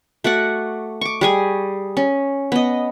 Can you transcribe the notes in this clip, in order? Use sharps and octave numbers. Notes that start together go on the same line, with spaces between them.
A3 F#4 D5 F#5
C#6 D6
G3 G#4 G#5
C#4
B3 D#5